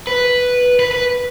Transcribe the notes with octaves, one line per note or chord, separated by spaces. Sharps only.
B4
B4
B4